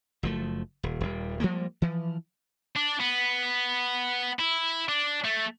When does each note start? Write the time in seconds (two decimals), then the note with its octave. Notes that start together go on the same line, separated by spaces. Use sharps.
0.23 F#1 F3 A3
0.83 D#1
1.01 D#1 G3
1.40 F3 G3 G#3 A#3
1.82 E3 F3
2.76 D4
3.00 B3
4.39 E4
4.89 D4
5.25 A3